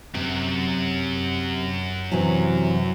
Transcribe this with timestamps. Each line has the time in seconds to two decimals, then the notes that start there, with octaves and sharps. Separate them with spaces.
0.15 F#2 C3
2.12 C3 E3 F#3